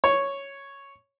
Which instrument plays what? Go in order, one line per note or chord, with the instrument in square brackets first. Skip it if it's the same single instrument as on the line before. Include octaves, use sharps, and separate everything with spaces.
[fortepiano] C#5